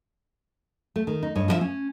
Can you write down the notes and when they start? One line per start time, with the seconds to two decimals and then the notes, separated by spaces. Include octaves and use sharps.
0.96 A3
1.07 D#3
1.23 D#4
1.35 G2 C#5 D#5
1.48 F3 G#3 D4 E4 F4 E5
1.61 C#4